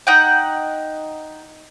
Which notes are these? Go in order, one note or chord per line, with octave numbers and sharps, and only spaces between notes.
D#4 F#5 G5